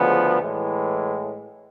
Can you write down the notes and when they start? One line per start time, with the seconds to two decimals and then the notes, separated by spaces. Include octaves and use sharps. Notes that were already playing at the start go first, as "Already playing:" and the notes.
Already playing: D2 C#3 F3 G#3 B3
0.39 A2 E3 G#3